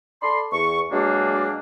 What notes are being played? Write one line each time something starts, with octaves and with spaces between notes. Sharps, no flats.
A4 D5 B5 C6
E2 C#6
B2 F#3 G#3 A#3 D4